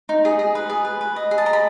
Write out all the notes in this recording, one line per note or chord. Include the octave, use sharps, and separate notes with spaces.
D#4
G#4
G#4
B4
G#4
B4
B4
D#5
G#4
A5
D#5 A#5
B5